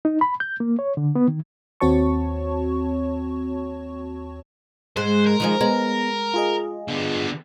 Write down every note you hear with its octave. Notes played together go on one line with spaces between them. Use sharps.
D#4
B5
G6
A#3
C#5
D3
B3
D#3
D#2 C4 F#4 C#5 A5 C#6
G#2 G#3 C5 C6 F#6
A#4
D#3 F3 G#3
G#3 B3 A#5
F4 G#4 D#5
D3 B3